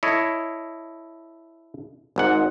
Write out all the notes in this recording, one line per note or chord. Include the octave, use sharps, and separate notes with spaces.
E4 A4 C#5 D#5
G#1 G#2 F#5